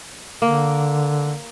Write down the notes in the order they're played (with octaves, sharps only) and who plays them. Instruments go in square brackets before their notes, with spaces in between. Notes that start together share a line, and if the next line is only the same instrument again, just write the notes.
[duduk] D3 [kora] A#3